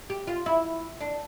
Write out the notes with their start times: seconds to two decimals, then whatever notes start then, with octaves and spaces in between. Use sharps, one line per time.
0.10 G4
0.27 F4
0.46 E4
1.01 D4